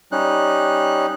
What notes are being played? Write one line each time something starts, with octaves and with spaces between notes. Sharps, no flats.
G3 C#4 D#4 F#6